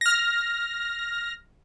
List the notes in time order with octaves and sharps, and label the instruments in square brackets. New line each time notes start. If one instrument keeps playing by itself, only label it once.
[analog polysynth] F6 A#6